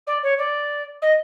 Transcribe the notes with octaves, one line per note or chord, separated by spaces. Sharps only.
D5
C#5
D5
D#5